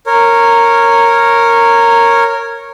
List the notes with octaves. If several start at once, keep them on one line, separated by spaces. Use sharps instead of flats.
A#4 C#5